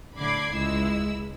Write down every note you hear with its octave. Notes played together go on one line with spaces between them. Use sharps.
A2 D3 B5 D6 G#6 C7
C#2 G#3 E4 E6